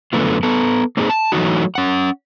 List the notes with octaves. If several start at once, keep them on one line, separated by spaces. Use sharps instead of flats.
F#2 D3 A3 B3 F4
B3 A4
A#3 C4 D#4 G#4
A5
E3 F#3 G3 A3 D#4 F#4
C#4 F#5